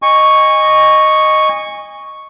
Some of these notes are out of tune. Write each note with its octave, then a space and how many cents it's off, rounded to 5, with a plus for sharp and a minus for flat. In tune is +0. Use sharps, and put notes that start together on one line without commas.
D#5 -5 G#5 -25 C#6 +0